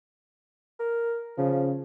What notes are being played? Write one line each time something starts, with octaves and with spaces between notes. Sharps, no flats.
A#4
C#3 F3